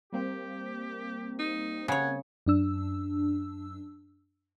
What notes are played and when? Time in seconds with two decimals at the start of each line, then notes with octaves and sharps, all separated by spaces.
0.13 G3 A#3 C4 G4
1.39 D#4
1.88 C#3 C#5 F#5 G#5
2.46 F#2 D4 E6